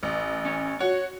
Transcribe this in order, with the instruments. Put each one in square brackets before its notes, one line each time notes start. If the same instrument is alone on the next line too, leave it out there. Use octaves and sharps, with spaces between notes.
[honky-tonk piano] A1
[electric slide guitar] C#4
[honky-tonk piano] F#4 [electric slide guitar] C#5